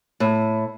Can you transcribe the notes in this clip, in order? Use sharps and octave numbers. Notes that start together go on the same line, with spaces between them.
A2